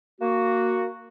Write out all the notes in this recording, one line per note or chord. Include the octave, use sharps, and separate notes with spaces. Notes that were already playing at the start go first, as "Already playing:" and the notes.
A#3 F#4